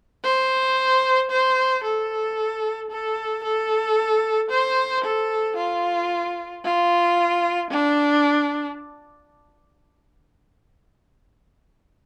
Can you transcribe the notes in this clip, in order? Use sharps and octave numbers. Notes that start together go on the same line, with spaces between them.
C5
C5
A4
A4
A4
C5
A4
F4
F4
D4